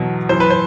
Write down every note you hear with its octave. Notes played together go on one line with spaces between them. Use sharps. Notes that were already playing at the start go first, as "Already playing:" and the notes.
Already playing: E2 B2 F#3
F#2 E3 C5
B4
C5